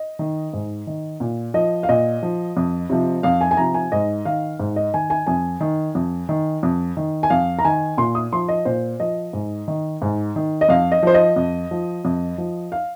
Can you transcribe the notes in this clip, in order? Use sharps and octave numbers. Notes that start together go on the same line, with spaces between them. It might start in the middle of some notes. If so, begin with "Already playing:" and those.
Already playing: D#5
D#3
G#2
D#3
A#2
F3 D#5
F5
A#2 D#5
F3
F2
C3 F3
F2 F5
G#5
G#5
C3 F3 A#5
G#5
G#2 D#5
D#3 F5
G#2
D#5
D#3 G#5
G#5
F2 G#5
D#3
F2
D#3
F2
D#3
G#5
F2 F5
A#5
D#3 G#5
A#2 C6
D#6
F3 C6
D#5
A#2 C5
F3 D#5
G#2
D#3
G#2
D#3
D#5
F2 F5
D#5
F3 C5
D#5
F2
F3
F2
F3
F5